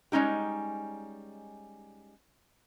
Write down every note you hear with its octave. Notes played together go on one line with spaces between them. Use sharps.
G3 G#3 C#4 D#4 G4